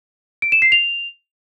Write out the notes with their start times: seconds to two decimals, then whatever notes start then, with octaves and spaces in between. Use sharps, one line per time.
0.42 D7
0.52 E7
0.62 C7
0.72 F7